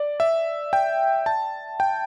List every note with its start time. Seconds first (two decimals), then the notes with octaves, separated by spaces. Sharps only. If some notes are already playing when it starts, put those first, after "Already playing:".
Already playing: D5
0.20 E5
0.73 G5
1.26 A5
1.80 G5